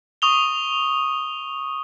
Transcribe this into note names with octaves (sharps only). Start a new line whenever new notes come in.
C#6 D#6 F7 G7